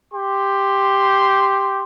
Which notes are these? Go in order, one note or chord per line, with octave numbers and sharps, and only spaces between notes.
G4 C6